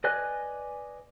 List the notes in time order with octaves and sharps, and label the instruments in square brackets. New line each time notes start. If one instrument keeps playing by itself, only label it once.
[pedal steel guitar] B4 D5 D#5 G#5 F#6